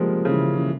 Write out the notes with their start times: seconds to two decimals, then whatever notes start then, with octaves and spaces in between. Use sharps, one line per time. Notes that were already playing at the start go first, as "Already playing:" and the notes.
Already playing: F3 G3 G#3 A#3
0.25 C#3
0.31 E3
0.56 E3